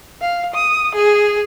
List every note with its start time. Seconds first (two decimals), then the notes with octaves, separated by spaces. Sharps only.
0.21 F5
0.54 D#6
0.95 G#4